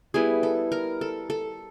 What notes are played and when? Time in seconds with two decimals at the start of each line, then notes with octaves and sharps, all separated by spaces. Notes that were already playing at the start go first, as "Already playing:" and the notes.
0.14 G3 B3 E4 G#4
0.43 A4
0.72 A#4
1.01 A4
1.30 A4